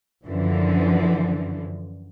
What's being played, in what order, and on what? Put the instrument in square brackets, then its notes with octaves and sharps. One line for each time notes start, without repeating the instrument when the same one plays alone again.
[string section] F#2 D3 E3 F3